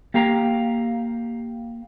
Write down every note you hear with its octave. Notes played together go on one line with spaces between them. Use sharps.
A#3 G4 F5 A#5